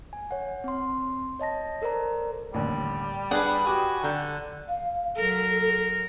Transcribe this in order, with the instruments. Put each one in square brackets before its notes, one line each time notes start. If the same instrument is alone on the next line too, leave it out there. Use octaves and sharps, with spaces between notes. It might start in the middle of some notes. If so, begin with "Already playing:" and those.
[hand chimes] G#5
C#5 F#5
C4 C6
C#5 D#5 A5 A#6
A4 A#4 C5 D5 A#5
[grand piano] A1 D#2 D3 [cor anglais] G3
[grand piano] D4 [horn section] G#4 [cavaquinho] B4 F#5
[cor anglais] F#4 [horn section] G4 G#5 [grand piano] D6 D#6
[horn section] D3 [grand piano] F#5 A#5 G6
[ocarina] F5
[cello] F#3 A#4 [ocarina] A4